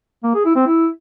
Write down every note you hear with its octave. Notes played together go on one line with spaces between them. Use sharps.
A#3
G#4
E4
C4
E4